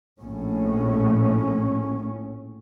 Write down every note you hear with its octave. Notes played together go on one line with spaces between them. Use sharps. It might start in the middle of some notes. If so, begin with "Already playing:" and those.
A#1 A2 C#4